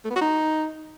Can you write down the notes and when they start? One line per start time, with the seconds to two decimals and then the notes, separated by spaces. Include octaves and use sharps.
0.05 A3
0.10 B3
0.16 F#4
0.21 D#4